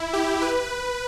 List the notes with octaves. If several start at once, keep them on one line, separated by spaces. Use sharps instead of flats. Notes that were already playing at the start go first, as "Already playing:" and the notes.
Already playing: E4
G4
B4